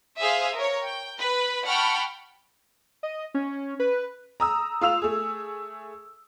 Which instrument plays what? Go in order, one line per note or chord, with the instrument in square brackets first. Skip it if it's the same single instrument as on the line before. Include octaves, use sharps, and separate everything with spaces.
[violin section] G#4 C5 E5 F5 D#6
A#4 C#5
G5
B4 B5
F#5 G5 A5 B5 C#6 F6
[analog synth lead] D#5
C#4
B4
[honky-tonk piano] A#5 D#6 E6
F4 F5 E6 F7
A3 G#4